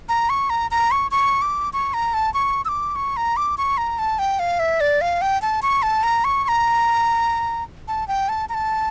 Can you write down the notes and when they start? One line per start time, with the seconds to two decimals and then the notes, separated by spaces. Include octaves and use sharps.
0.09 A#5
0.30 C#6
0.50 A#5
0.71 A#5
0.91 C#6
1.11 C#6
1.42 D6
1.73 C#6
1.94 A#5
2.14 A5
2.34 C#6
2.65 E6
2.69 D6
2.96 C#6
3.17 A#5
3.37 D6
3.58 C#6
3.78 A#5
3.99 A5
4.19 G5
4.39 F5
4.59 E5
4.81 D5
5.01 F5
5.22 G5
5.42 A5
5.62 C#6
5.83 A5
6.03 A#5
6.24 C#6
6.44 C#6
6.48 A#5
7.88 A5
8.08 G5
8.29 A5
8.49 A#5
8.54 A5